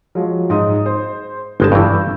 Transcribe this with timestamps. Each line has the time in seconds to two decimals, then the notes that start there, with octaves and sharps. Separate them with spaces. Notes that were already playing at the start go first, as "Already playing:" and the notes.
0.15 F3 F#3 G#3
0.50 G#2 D#4 D#6
0.86 C5
1.60 G1 G#3 A5 G6
1.72 G2 E3